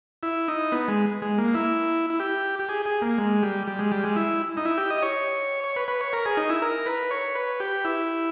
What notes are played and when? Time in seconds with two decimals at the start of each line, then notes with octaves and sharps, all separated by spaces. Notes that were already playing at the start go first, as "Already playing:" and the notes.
0.23 E4
0.48 D#4
0.72 B3
0.88 G#3
1.22 G#3
1.38 A#3
1.54 E4
2.10 E4
2.20 G4
2.59 G4
2.69 G#4
2.86 G#4
3.02 A#3
3.18 G#3
3.43 G3
3.67 G3
3.79 G#3
3.92 G3
4.04 G#3
4.16 E4
4.57 D#4
4.65 E4
4.78 G4
4.90 D#5
5.02 C#5
5.64 C#5
5.76 B4
5.88 B4
6.01 C#5
6.13 A#4
6.26 G#4
6.37 D#4
6.50 E4
6.62 A#4
6.86 B4
7.11 C#5
7.35 B4
7.60 G4
7.84 E4